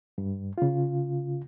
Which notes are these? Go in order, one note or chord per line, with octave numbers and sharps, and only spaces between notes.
G2
C#3 F4